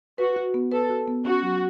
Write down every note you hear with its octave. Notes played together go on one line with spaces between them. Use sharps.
F#4 B4
F#4
B3
A4 B4
F#4
B3
C#4 F#4
F#3